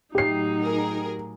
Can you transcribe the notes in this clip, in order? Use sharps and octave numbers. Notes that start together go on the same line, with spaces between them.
A2 F#3 D#4 G4 C7
G#4 A#4